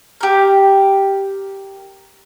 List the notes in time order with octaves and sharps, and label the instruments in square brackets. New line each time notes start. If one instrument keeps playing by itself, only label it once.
[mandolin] G4 A#4